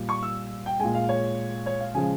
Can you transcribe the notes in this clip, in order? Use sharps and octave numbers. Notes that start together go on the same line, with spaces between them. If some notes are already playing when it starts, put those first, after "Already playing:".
Already playing: A#2 G3
C#6
E6
G5
A#2 G#3 G#5
F5
C#5
C#5
F5
C#3 F3 G#3 G#5